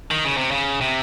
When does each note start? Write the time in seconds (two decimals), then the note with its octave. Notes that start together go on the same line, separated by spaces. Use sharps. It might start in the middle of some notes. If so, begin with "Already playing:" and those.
0.11 D#3
0.25 C#3
0.37 C3
0.51 C#3
0.81 C3